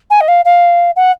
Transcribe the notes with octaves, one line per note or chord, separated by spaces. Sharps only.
G#5
D#5
F5
F5
F#5